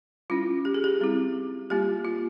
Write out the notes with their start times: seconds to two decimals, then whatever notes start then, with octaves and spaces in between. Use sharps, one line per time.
0.30 G3 C#4 E4 F4
0.65 G4
0.74 G#4
0.84 G4
1.00 G3 C4 E4
1.70 G3 A#3 F4 G4
2.05 F4